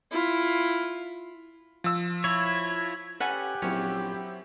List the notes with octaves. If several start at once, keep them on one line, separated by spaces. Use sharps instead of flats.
E4 F4
F3 E6
E4 C#5
C#4 G4 A4 B4 F#5 G#5
A#1 F#3 C4 C#4 E4 C#5